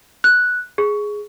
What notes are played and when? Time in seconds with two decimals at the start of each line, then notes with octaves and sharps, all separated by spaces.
0.24 F#6
0.78 G#4